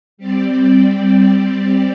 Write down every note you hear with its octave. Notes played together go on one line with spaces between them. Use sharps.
G3 C4 G4 D5